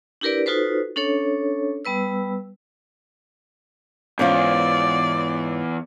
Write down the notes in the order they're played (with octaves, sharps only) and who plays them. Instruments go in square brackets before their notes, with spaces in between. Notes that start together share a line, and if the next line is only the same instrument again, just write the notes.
[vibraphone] D4 E4 G4 A#4 B4 D5
D#4 F4 F#4 A4 B4 C5
C#4 D4 A4 C#5
G3 B3 B4 E6
[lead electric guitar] E2 [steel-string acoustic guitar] G#2 C#4 F4 [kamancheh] D5